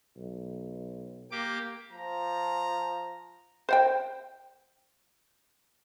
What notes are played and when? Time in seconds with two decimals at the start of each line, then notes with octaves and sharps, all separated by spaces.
0.17 B1
1.31 A#3 G4 D6
1.93 F3 A#5
3.69 C5 F#5 G5